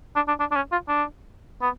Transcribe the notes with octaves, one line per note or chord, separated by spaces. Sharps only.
D4
D4
D4
D4
C#4
F4
D4
B3